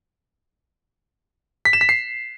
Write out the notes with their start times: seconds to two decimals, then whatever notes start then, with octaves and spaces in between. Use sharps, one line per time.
1.65 B6
1.73 E7
1.81 B6
1.89 C7